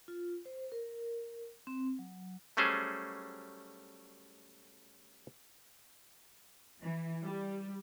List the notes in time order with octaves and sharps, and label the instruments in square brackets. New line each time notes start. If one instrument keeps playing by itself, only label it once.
[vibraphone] F4
C5
A#4
C4
F#3
[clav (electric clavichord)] F#3 G3 A3 C#4 G#4 C5
[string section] E3
G3